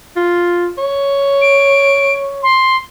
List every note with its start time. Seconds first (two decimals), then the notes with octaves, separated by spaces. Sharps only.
0.16 F4
0.78 C#5
1.42 D7
2.43 C6